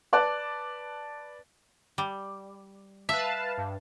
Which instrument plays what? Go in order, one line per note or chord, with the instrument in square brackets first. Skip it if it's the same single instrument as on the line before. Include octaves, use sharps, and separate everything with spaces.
[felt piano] B4 D5 A5 D6 F#6
[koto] G3
[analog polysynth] B4 F5 A5 [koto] E5
[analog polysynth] G2